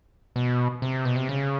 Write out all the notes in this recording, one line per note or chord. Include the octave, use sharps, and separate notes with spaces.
B2
C3
B2
C3
C#3